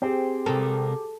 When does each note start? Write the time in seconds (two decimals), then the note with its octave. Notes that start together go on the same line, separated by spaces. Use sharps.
0.02 C4 G4 G#4 C5
0.46 C3 A4 A#4